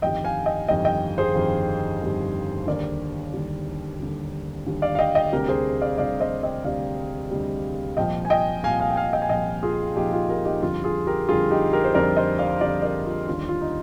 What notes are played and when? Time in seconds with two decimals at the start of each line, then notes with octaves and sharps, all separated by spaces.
0.02 G1 F2 D#3 G3 D#5 G5
0.24 F5 G#5
0.46 D#5 G5
0.68 G1 F2 D#3 G3 D#5 G5
0.85 D#5 G5
1.18 G#4 C5
1.35 G1 F2 D#3 G3
2.01 G1 F2 D#3 G3
2.67 D#2 D3 G3 A#4 D5
3.33 D#2 D3 G3
4.00 D#2 D3 G3
4.66 D#2 D3 G3
4.82 D5 F5
4.95 F5
4.99 D#5 G5
5.15 D#5 G5
5.32 D2 C3 G3 G4 A#4
5.48 G#4 C5
5.81 D5 F5
5.98 D2 C3 G3 D5 F5
6.20 C5 D#5
6.43 D#5 G5
6.64 D2 C3 G3 D5 F5
7.31 D2 C3 G3
7.97 C2 A#2 F3 D#5 G5
8.25 G#5
8.30 D#5 G5
8.63 C2 A#2 F3 F5 G#5
8.80 F5 G#5
8.91 G5
8.96 F5 G#5
9.13 D#5 G5
9.22 G#5
9.29 C2 A#2 F3 D#5 G5
9.63 F4 G#4
9.95 C2 A#2 F3 D#4 G4
10.13 F4 G#4
10.29 G4 A#4
10.45 D#4 G4
10.62 F2 D3 G3 F4
10.84 F4 G#4
11.07 G4 A#4
11.28 F2 D3 G3 F4 G#4
11.51 D#4 G4
11.73 G4 A#4
11.84 C5
11.94 F2 D3 G3 A#4 D5
12.17 C5 D#5
12.38 D5 F5
12.61 F2 D3 G3 D5 F5
12.82 A#4 D5
13.06 F4
13.27 D#2 D3 G3 F4
13.49 F4
13.61 D#4